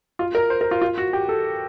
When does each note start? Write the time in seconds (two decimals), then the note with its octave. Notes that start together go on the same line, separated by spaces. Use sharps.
0.19 F4
0.35 A#4
0.50 C5
0.61 A#4
0.71 F4
0.81 F4
0.98 F#4
1.13 G4
1.29 A4